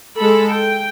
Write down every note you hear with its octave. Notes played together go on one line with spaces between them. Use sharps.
G#3 A4 B5
G5